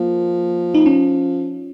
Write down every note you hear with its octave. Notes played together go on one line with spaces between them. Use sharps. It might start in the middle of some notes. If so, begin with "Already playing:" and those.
Already playing: F3 A#3
D#4
C#4